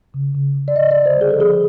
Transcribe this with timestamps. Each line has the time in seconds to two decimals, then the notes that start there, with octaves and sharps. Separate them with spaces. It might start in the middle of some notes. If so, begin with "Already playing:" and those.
0.14 C#3
0.35 C#3
0.55 C#3
0.68 D5
0.75 D3 D#5
0.91 D5
0.96 D3
1.06 C5
1.16 G3
1.21 G#4
1.31 A4
1.36 F3 G#4